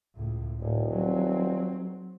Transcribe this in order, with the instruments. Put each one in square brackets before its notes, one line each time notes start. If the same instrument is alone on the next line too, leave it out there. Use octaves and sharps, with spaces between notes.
[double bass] C#2 A2
[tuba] D#1 [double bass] A2
[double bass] F#3 C4